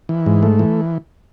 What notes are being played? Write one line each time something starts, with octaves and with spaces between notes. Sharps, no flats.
E3
G#2
A3
E3